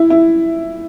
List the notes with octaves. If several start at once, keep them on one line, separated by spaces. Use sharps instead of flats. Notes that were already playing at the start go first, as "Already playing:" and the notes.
Already playing: E4
E4